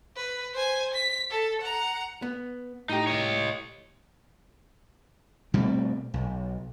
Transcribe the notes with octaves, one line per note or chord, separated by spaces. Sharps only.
B4
C5 G#5
B6
A4
F#5 A#5
B3
A2 D#4 G4
C#5 D#5
B2 G3 A3 C4
B1